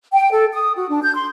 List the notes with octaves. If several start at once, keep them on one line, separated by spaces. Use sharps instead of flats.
G5
A4
D#6
F#4
D4
G6
C6